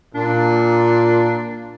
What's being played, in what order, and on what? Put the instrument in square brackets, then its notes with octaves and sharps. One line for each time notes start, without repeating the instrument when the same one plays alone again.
[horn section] A#2 [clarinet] D4